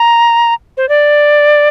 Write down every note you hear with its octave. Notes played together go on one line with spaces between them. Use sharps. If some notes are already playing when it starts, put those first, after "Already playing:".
Already playing: A#5
C5
D5